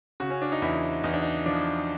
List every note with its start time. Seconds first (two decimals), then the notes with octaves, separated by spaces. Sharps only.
0.20 C#3 F#4
0.30 C#4
0.42 D4
0.52 D#4
0.62 E2 E4
1.04 E2 D#4
1.13 D4
1.22 D#4
1.46 F3 D4